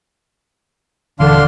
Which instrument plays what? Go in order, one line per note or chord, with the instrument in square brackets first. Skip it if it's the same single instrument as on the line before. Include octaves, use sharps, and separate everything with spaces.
[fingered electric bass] D#1 E3 [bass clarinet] D3 [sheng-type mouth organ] D4 F5 C6